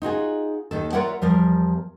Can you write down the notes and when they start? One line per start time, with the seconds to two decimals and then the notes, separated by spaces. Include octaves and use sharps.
0.02 D#4 F4 F#4 G#4
0.71 D#2 D#3 A4
0.93 F4 A#4 C#5 D5 E5 F#5
1.22 E2 F3 G3 A#4